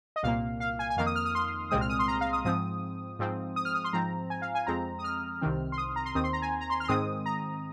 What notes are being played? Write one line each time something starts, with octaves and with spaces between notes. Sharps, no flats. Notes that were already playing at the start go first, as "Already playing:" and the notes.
D#5
C2 A#2 A#3 F5
F5
G#5
G#5
F2 D#3 A#3 F5
D#6
F6
D#6
C6
C2 A#2 G#3 C4 D#6
F6
D#6
C6
A#5
F5
D#6
G#2 F3 C4 D#6
G#2 F3 C4
D#6
F6
D#6
C6
G#2 F3 C4 A#5
G#5
F5
G#5
F2 F3 G#3 C4 A#5
D#6
F6
C2 C3 D#3 C4
C6
D#6
A#5
C6
D#2 D#3 C4 D#6
C6
A#5
G#5
A#5
C6
F6
C6
G#2 D#3 G#3 C4 D#6
A#5